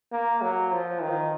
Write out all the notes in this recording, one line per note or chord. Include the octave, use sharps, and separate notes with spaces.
A#3
F#3
F3
D#3